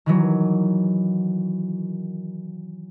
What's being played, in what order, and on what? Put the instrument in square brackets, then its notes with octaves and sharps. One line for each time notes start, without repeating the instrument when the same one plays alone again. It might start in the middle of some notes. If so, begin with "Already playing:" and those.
[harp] D#3 E3 F#3